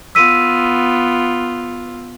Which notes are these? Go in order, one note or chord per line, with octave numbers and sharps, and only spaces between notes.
B3 F4 E6 B6 D#7